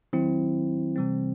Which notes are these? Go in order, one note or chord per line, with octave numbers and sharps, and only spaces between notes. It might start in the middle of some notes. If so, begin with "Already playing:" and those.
D#3 F#3 C4 E4
C3 E3 G3 C4